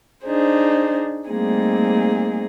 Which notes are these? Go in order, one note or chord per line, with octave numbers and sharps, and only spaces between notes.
D4 D#4 G#4 C5
G3 A3 A#3 C4 D#4 G#4